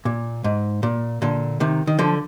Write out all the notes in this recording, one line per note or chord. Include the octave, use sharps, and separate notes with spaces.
A#2
G#2
A#2
A#2 D3
C3 D#3
D#3
D3 F3